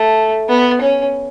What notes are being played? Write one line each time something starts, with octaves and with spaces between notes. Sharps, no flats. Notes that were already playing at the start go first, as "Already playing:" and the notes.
Already playing: A3
B3
C#4